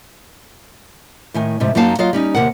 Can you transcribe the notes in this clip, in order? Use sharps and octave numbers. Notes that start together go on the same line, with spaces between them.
A2 D#3 G#5
F2 G#2 C3
F#2 F#3 A#3 D#4 F5 A5
F#3 F4 D#5 F5
G3 C#4 D#4
D#2 C3 A#4 F#5